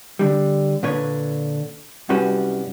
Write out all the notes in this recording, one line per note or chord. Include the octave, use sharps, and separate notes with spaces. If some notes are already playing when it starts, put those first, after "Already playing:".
D3 G3
A#2 D3 B4 C#5
C2 F#2 G3 C#4 F#4 B4